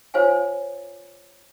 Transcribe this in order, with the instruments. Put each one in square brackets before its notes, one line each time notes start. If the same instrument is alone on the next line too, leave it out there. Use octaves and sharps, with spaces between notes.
[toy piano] F4 C5 C#5 F5 G#5